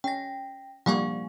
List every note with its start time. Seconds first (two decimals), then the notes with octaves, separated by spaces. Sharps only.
0.04 C#4 G5 A#6
0.86 F3 G3 A#3 F#5 G#5 C#6